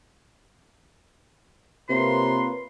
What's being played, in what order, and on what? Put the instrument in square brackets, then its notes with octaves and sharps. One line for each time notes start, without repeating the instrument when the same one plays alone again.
[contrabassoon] C3 [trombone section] A#3 F4 B4 [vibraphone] A#4 C#5 A#5 [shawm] C6